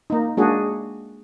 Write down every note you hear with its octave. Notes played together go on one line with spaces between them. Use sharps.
A#3 D#4
G#3 A#3 D4 F#4 G#4